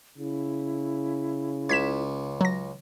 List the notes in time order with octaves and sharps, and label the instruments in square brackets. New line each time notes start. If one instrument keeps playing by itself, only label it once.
[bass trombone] C#3 [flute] E4
[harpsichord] C#2 [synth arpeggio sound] G#6 B6 E7
[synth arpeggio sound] F#3 A#6